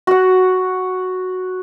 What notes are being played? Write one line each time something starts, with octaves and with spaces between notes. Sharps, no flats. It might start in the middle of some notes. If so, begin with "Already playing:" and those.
F#4 F#5